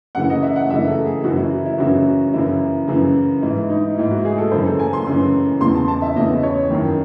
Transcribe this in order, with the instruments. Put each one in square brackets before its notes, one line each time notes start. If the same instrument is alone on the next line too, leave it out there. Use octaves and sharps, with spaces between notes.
[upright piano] F#2 C#3 E3 F#5
D#5
E5
F#5
F#2 C#3 E3 E5
A4
G#4
F#2 C#3 E3 F#4
E4
E4
F#2 C#3 E3 F#4
F#2 C#3 E3 E4
F#2 C#3 E3
G#2 E3 E4
D#4
G#2 E3 E4
F#4
G#4
A4
F#2 C#3 E3 C5
A4
G#5
C6
F#2 C#3 E3
E2 C#3 E3 C6
A5
A5
E5
E2 C#3 E3 D#5
C#5
F#2 D#3